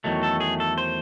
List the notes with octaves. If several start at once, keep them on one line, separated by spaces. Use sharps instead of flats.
E2 D#3 F#3 A3
A4
G#4
A4
C5